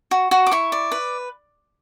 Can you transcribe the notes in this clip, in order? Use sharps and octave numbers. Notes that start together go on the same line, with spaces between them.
F#4
F#4
D6
E4 C#6
D5
B4